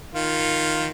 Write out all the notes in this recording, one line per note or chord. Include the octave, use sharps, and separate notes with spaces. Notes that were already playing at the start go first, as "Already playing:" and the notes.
D#3 F4